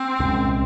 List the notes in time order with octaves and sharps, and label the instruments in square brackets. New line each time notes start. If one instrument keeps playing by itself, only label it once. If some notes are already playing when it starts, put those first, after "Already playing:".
Already playing: [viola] C4
[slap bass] C2 A#2 G#3 C#4